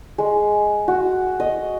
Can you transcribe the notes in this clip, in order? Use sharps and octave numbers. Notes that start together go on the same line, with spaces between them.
G#3
F#4
D#5